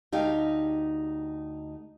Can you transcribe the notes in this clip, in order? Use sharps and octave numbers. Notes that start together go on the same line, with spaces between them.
D2 D#4 G4 F5